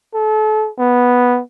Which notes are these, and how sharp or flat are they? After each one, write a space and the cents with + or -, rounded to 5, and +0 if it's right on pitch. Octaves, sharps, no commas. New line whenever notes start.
A4 -30
B3 -5